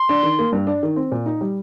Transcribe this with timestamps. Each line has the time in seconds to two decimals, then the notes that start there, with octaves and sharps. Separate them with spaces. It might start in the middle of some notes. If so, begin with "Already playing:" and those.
Already playing: C6
0.09 D4
0.23 D#3
0.39 A#3
0.52 G2
0.67 D4
0.83 D#3
0.96 C4
1.12 A#2
1.26 D#4
1.41 G3